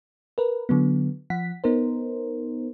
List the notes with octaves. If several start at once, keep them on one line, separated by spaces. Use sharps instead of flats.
A#4 B4
D3 F#3 B3
F3 F#5 B6
B3 D#4 A#4 C5